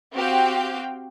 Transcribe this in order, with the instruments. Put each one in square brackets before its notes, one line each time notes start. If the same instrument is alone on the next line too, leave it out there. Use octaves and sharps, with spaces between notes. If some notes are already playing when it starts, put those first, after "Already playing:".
[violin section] C4 F#4 G4 F5 G5